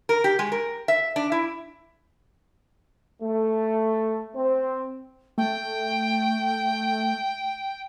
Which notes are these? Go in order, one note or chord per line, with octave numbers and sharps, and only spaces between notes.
A#4
G4
G#3
A#4
E5
D4
E4
A3
C4
A3 G5